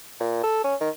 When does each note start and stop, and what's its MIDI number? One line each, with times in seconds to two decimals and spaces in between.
0.20 0.42 46
0.43 0.64 69
0.64 0.75 61
0.81 0.90 51